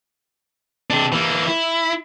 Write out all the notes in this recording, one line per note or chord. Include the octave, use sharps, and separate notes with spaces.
C3 D4
E3 A#3
E4